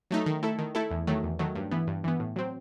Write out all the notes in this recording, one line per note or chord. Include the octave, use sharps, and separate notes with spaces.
F#3 A3 D#4
D#3
A3 E4 A4
D#3
A3 E4 A4
E2
D#3 F#3 A3
E2
D#3 F#3 A3
G2
E3 B3
G2
E3 B3
A2
F#3 C4